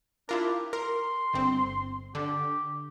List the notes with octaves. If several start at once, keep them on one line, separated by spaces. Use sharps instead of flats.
D4 E4 F4 A#4
G4
A#4 C6
G1 C4
D3 G4